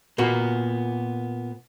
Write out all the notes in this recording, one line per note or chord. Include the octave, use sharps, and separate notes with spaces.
A#2 A#3 B3 F#4